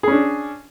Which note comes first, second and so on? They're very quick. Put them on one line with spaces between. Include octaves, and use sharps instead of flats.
G#4 C#4 D4